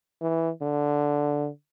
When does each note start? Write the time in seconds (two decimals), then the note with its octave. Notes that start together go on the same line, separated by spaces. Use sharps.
0.21 E3
0.62 D3